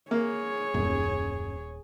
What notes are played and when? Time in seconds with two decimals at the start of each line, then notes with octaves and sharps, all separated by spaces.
0.11 A#3 G#4 C#5
0.74 D#1 F#2